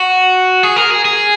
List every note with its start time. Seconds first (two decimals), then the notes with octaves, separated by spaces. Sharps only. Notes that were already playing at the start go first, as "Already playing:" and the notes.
Already playing: F#4
0.63 G#4
0.76 A#4
0.90 G#4
1.05 G#4